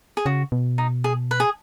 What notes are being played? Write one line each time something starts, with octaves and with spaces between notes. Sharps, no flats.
G#4
C#3 F#4
B2
D#4
G#4
B4
G#4